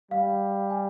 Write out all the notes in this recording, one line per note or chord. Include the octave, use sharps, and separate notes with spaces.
G3 F5
G#5